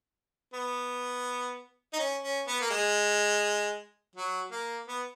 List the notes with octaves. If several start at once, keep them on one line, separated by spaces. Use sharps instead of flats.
B3
D#4
C#4
C#4
B3
A#3
G#3
F#3
A#3
B3